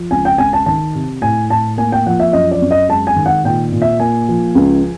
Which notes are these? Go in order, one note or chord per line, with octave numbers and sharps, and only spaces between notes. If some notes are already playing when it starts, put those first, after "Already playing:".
Already playing: F3
C#2 G#5
G5
C#2 G#5
A5
D#3 A5
C3
A2 G#5
A2 A5
A#3 G#5
G5
F3 F#5
E5
F#2 D#5
D5
F#2
D#5
G#3 A5
G#5
D#3
F#5
A#2 G5
A#2
E5
A#3 G#5
F3
C#2